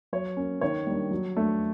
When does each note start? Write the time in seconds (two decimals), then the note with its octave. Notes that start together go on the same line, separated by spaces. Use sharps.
0.13 F#3 C#5
0.37 A#3 C#4
0.61 D#3 C#5
0.87 G3 A#3 D4
1.11 F#3
1.37 A3 D4